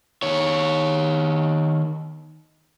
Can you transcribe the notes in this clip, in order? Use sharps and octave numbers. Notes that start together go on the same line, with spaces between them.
D#3 C#5